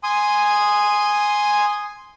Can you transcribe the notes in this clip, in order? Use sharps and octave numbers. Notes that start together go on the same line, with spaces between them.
G#5 C6 D#6